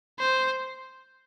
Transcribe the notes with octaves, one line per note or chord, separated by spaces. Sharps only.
C5